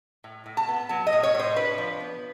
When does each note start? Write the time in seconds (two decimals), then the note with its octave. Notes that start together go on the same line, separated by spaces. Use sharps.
0.24 A2
0.46 A2
0.57 A5
0.68 B3
0.89 F#3 A5
1.07 D#5
1.13 A2
1.23 C#5
1.35 A2 C5
1.56 D4 B4
1.78 F3
2.00 B3